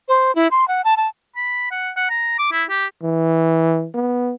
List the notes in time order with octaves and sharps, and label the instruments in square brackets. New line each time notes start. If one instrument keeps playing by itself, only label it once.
[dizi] C5
E4
C6
F#5
A5
A5
[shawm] B5
F#5
F#5
A#5
D6
E4
G4
[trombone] E3
B3